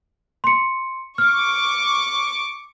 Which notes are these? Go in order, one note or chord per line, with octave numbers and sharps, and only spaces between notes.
C6 C#7
C#6 D6 F6